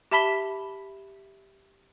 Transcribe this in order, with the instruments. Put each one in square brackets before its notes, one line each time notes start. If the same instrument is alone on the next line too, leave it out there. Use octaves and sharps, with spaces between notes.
[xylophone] G4 E5 A5 B5 B6 G7